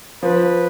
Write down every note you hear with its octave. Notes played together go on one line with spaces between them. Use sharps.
F3 B4